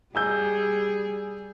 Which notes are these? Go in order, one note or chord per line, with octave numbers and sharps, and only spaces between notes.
G3 G#4 G#5 E6 G6